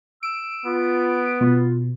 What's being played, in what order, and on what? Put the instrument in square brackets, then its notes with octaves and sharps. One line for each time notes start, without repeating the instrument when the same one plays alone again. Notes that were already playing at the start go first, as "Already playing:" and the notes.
[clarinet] E6 [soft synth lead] D7
[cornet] B3 [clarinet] F4
[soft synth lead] B2 [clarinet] F4